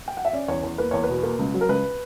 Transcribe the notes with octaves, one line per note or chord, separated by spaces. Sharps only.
G5
F#5
E5
C#4 D5
E2 C#5
E2
A#3 B4
E2 C#5
B4
B2
A#3
C#2
F#3
A#4
C#2 B4